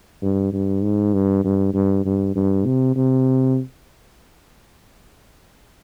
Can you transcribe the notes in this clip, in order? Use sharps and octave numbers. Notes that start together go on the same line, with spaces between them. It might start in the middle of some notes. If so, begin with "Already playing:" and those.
G2
G2
G#2
G2
G2
G2
G2
G2
C3
C3